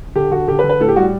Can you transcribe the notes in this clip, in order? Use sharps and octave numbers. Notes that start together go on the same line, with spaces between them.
D3 G4
D3 F#4
D3 G4
B4
D3
B4
A2 A4
G4
G3 F#4